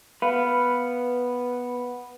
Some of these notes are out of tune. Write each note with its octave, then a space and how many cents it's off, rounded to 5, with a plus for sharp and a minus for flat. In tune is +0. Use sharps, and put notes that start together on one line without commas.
B3 -5 B4 +0 F5 -5